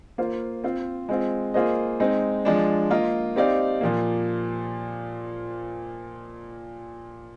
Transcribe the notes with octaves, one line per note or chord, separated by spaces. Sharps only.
A#3 F4 C5
C4 F4 C5
G#3 C4 F4
A#3 F4 G#4 C5 D#5
G#3 C4 D#4
F3 G#3 D4
A#3 F4 A#4 D#5
C4 D#4 G4 D5 F5
A#2 F3 A#3